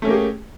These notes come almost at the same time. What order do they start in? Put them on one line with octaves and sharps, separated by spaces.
A3 C#4 A#3 G4 G#4